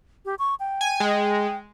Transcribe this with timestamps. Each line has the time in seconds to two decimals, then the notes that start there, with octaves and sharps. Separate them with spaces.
0.25 G4
0.39 C#6
0.60 G5
0.81 G#5
1.00 G#3